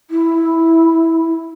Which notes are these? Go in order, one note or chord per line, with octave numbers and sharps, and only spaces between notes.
E4